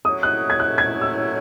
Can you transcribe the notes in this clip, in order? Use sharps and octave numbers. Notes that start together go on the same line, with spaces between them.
A2 F#3 C#4 E4 D#6
F#6
G#6
F#6
G#6
E6